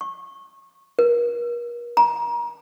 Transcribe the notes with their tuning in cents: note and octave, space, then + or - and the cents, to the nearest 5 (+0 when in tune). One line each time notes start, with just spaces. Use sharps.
C#6 -25
A#4 +40
A#5 +30